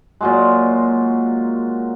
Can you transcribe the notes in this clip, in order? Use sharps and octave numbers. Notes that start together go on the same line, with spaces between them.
A#2 F#3 G#3